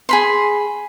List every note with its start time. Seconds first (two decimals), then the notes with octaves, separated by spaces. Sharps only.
0.09 G#4 B5 C6